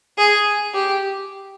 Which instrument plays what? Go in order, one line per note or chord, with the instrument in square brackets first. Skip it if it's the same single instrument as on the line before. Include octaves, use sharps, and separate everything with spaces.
[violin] G#4
G4